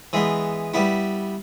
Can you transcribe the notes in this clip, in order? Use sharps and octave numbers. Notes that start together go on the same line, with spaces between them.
E3 G#3 B3
G3 B3 E4